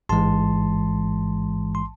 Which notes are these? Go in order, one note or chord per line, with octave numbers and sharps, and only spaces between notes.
A1 G#2 E3 G#3 A5 C6
C6